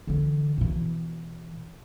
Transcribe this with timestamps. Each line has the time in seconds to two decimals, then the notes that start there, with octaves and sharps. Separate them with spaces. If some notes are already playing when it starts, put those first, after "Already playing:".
0.07 D3 E3
0.58 B2 E3